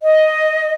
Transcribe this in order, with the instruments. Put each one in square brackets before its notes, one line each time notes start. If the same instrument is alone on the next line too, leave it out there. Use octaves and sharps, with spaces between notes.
[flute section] D#5